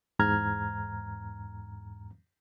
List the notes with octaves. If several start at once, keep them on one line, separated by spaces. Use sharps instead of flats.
E2 G#2 A#5 F6 G#6